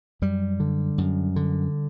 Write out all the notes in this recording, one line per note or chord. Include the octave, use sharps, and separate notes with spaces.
F#2 G3
D3
F#2
D3